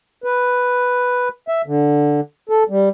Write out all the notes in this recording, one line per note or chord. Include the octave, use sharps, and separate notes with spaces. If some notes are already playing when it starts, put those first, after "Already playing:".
B4
E5
D3
A4
G3